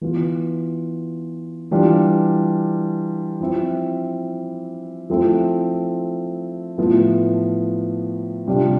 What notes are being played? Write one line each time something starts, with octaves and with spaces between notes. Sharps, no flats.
E3 B3 F4
E3 G3 D4 F4
F3 C4 E4
F3 A3 C4 E4
A2 F3 B3 E4
C3 G3 D4 F4